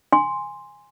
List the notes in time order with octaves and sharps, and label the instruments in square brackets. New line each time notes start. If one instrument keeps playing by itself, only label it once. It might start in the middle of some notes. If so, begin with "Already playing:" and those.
[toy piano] G#5 C6